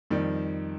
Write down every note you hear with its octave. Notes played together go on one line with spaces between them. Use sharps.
F2 D#3 G3